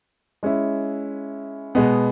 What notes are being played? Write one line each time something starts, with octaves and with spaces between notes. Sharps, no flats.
G#3 C#4 E4
B2 G#3 B3